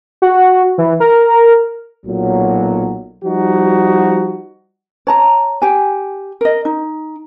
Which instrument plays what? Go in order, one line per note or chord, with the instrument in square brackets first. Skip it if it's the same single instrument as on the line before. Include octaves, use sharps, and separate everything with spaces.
[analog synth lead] F#4
E3
A#4
[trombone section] B1 A#2 F#3
F3 G3 D#4 F#4
[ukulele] C#5 A5 A#5
G4 G#5
A#4 D#5
D#4